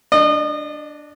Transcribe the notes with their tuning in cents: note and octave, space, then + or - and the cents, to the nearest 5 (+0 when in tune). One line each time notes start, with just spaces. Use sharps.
D4 +0 D#5 -35